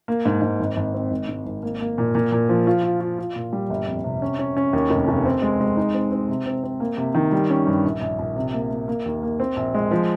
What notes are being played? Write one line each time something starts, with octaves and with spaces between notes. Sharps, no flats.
A#3
G#2
G#2
G#1
G#1
C4
G#1
G#2
G#1
A#3
A#3
A#2
A#2
A#2
F3
F4
F4
F4
F4
A#2
G3
G1
F2
C3
C#4
C#4
C#4
D#2
F1
F1
C4
G#3
G#3
D#4
C4
C4
C3
C4
C4
A#3
C3
D#3
G3
C#4
G2
A#1
A#1
A#1
C3
A#3
A#3
A#3
D#2
A#3
C4
A#1
G#3
F3